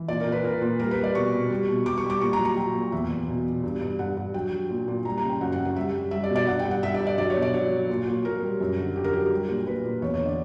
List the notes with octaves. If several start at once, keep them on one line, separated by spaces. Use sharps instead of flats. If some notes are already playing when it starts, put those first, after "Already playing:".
Already playing: E3
A#2 D5
A#4
A#2
B4
A#2 A#4
A#2
G3 A#4
B4
G3
D5
B2 C#6
B2
G3
B2
G3 D6
C#6
G3
D6
A#2 C#6
A#5
F#3
A#5
F#3 G5
A#2
E2 E5
E2
B2
B2
G2
G2
G2 F#5
G2
F#3 G5
F#3
A#2
A#2
G3 A#5
A#5
C#3
G5
F#2 F#5
F#5
F#2
F#5
G3 E5
G3
G3 E5
D5
B2
D5
G2 F#5
G5
G2
F#5
G2 E5
D5
G2
D5
F#3 D5
C#5
B2
D5
F#3 C#5
F#3
A#2
A#2
A#2 A#4
G3
F#2
D3
D3 G4
A#4
F#3 G4
A#4
G3
A#2
A#2 B4
A#2
E2 C#5
C#5
D3
D5